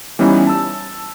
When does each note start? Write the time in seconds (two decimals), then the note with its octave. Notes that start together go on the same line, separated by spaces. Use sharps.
0.19 E3 G3 B3 C#4 D#4 E4
0.47 A5 E6